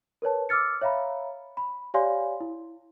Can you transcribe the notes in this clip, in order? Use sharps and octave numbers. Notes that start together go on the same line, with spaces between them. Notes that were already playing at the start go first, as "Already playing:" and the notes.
A#4 B4 C#5 A5
D6 E6 F6 A6 C#7
C#5 E5 F5 A#5 B5
B5
G4 C#5 D5 F5 G#5 C6
E4